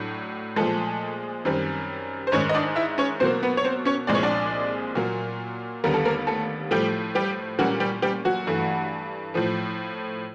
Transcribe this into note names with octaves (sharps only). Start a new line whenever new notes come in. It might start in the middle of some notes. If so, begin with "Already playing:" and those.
Already playing: A2 F#3 D4
A#2 F3 G#3 A3 A4
F#2 D#3 G3 C4
C5
G#2 D#3 G#3 C#4 C#5
D#5
D4 D5
E4 E5
C#4 C#5
B2 F#3 A#3 C4 C5
B3 B4
C#5
C4 C5
C#4 C#5
C2 A#2 F3 G#3 D5
C#5
D4 D5
A#2 F#3 A#3
D#2 D3 G3 B3 A#4
A4
A#3 A#4
A3 A4
A2 F3 G3 A3 G4
G3 G4
A#2 F#3 G3 A#3 C#4 F#4
G3 G4
G3 G4
F#3 F#4
G2 E3 A3
A2 F3 A3